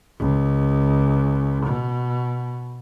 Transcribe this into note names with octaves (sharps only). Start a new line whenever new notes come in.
C#2
B2